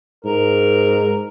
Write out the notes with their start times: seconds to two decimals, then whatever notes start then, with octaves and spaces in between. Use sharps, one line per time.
0.25 G#2 A#4